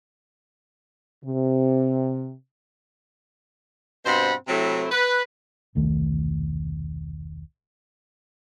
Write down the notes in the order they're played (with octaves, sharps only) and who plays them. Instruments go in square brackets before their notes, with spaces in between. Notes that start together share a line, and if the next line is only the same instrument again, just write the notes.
[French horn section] C3
[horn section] G2 B2 C4 C5 F#5 B5
C3 F#3 A3 C4 E4
B4
[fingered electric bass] E1 C2 D#3 A3